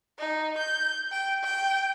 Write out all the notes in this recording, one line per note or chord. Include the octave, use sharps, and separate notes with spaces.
D#4
G6
G5
G5